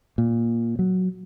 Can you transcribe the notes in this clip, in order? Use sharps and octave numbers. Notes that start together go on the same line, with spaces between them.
A#2
F#3